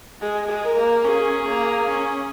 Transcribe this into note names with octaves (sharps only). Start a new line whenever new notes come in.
G#3 G#4
G#3
A#4
A#3
C#4 G#4
A#3
C#4